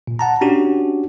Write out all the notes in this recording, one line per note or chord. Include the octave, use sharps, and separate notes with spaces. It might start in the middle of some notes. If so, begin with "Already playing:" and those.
A#2
F#5 A5 A#5
C#4 D4 F#4 G4